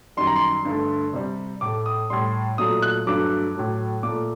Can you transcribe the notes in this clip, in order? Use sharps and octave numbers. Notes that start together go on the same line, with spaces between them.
F#2 D#3 G3 C6
A#5
C6
G2 D3 A3
C3 G3
A2 A3 D6
D#6
A2 G3 C6
A#2 F#3 A3 D#6
F#6
G2 F#3 A3 D6
A2 F#3 A3
A#2 A3 D6